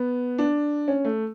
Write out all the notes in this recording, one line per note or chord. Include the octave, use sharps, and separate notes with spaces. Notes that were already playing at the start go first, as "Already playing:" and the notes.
Already playing: B3
D4
C#4
A3